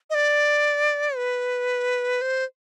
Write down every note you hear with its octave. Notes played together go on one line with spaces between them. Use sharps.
D#5
D5
B4
C5